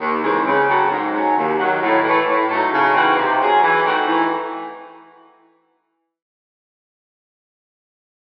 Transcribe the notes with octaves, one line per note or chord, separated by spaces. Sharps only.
D#2
C#3 E3 G#3 C4
C#3
F#3 C4 F#4 A4
G#2
F#3 C#4
D#2
D#3 F#3
A2
E3 A3
A2
F#3 A3 D#4 A4
C#3
E3 C4 D#4 F#4
C3
F#3 C#4 G#4
E3
A3 C4 D#4 F#4
E3